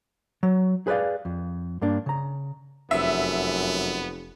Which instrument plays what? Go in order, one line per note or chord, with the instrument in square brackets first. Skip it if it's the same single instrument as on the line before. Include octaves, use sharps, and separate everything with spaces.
[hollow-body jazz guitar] F#3
G#4 B4 C5 D5 F5
F2
G2 A#3 D4
C#3 A#5
[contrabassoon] F1 [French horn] F#2 [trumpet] B3 [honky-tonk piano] E5